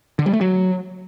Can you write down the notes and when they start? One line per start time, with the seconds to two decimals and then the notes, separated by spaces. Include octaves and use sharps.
0.19 D3
0.26 G3
0.33 A3
0.41 F#3